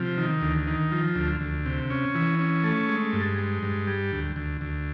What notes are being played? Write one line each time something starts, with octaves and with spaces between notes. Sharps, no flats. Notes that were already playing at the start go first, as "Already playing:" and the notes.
Already playing: C3 F3
D#3
D2
D#3
F3
D2
D2
C3
C#4
E3
C#4
A3
G#3
G2
G#3
G2
G3
D2
D2
D2